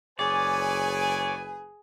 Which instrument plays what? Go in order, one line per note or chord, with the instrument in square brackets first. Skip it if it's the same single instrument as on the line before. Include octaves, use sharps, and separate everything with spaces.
[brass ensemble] F#1 B4 G#5 [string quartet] G#4 [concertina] C#5 [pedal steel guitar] D5